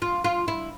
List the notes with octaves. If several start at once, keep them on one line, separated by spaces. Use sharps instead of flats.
F4
F4
E4